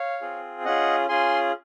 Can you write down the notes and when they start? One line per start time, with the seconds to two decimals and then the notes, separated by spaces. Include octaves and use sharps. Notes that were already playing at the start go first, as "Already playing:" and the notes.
Already playing: C#5 F5
0.21 C4 F4 G#4
0.65 C#4 F4 G#4 D#5 F#5
1.09 C#4 F4 G#4 G#5 C6